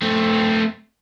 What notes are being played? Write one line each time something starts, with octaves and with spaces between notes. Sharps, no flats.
A3 C4